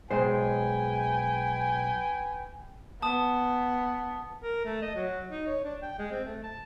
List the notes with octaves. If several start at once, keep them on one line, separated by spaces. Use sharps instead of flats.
B1 G#3 B4 C5 G5 G#5
B3 A5 D#6
A#4
A3
D#5
F#3
D#4
C#5
D4
G5
G#3
C4
A3
A5